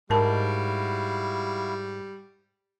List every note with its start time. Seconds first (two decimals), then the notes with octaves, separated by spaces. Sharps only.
0.10 G#2 G3 E4 F#4 A#4 F5 A5